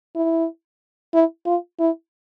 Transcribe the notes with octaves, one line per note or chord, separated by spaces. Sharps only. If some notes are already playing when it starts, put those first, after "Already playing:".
E4
E4
F4
E4